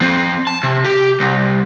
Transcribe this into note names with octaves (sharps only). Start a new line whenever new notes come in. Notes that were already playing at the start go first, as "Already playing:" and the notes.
F3 C4
A5
C3
G4
C2